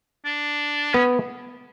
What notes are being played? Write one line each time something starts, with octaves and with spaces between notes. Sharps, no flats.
D4
B3 C#4